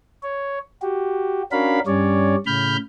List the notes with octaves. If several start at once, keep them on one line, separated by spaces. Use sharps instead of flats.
C#5
F#4 G4
C#4 D4 F#4 A#4 F5 B5
G2 G3 C#4 C#5 D5
A2 C#3 B5 F6 G6